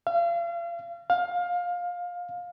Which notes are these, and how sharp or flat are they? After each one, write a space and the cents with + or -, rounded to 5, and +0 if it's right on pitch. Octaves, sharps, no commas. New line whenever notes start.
F5 -35
F5 +20